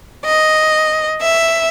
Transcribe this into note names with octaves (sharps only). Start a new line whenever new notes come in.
D#5
E5